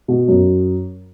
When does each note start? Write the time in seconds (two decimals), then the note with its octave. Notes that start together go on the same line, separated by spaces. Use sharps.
0.08 B2
0.28 F#2